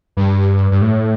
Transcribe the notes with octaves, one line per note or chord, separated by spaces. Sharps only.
G2
G2
A2